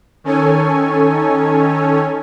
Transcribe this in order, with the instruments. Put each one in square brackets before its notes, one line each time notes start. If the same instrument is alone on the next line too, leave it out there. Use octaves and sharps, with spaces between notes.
[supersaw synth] D#3 C#4 A4 C#5 G#5